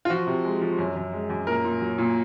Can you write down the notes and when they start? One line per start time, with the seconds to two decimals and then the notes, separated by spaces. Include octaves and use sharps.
0.05 F4
0.10 F3 F#4
0.27 C3
0.44 G#3
0.61 F3
0.78 F#2
0.96 F#2
1.13 G#3
1.30 F#2
1.47 A#2 A#4
1.64 A#2
1.81 F#3
1.98 A#2